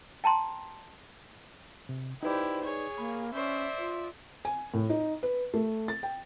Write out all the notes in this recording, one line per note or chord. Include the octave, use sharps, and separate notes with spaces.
G5 A5 A#5 C6
C3
D#4 E4 G4 B4 C5 D5
G#4 C#5
A#3 B5
C#4 C5 D5 E5
F4
G#5
A2
D#4
B4
A3
A6
G5